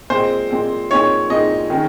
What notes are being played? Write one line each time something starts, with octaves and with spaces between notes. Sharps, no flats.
A#2 G#3 C4 C5
A#2 G#3 C4
A#2 G#3 C4 D#4 C#5
A#2 G#3 C4 D#4 D#5
D#3 G#3 C#4